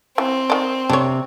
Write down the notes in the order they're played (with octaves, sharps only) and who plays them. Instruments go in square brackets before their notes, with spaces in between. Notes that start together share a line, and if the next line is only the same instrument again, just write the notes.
[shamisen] E3 [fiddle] C4
[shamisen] D#3 D5
[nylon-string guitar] C3 [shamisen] D4 C#5